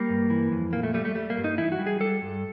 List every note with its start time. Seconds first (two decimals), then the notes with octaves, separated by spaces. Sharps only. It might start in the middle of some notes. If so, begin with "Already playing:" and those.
Already playing: G3 A#3
0.10 G2
0.30 E3
0.52 F2
0.73 A#2 A#3
0.83 A3
0.94 G3 A3
1.05 A3
1.15 G3 A3
1.30 A#3
1.37 G2
1.44 D#4
1.58 E3 E4
1.72 F#4
1.79 G3
1.87 G#4
2.00 G3 A4
2.22 G2